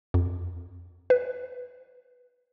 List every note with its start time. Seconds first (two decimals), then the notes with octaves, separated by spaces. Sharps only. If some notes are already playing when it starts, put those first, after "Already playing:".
0.14 F2
1.10 B4